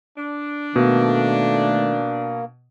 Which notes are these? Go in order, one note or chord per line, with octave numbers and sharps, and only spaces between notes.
D4
B2 D#3 A3 A#3